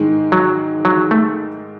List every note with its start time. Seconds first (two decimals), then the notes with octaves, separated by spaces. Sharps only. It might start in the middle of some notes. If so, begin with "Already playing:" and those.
Already playing: G#2 D#3 G#3
0.32 F#3
0.85 F#3
1.11 A3